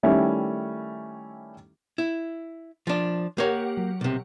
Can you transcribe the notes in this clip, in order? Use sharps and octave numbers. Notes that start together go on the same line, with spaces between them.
D#3 G3 A3 C#4 E4
E4
F3 D4
A#3 G4 A#4 C#5 F#5
F#3
B1 C3